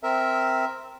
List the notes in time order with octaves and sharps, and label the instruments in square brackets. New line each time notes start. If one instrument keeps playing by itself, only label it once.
[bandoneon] C4 A#4 E5